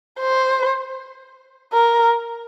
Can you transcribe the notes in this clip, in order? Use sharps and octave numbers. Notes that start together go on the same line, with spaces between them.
C5
A#4